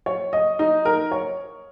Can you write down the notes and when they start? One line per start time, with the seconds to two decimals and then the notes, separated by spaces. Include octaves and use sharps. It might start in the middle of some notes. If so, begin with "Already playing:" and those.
0.06 C#5
0.33 D#5
0.59 D#4
0.85 A#4
1.12 C#5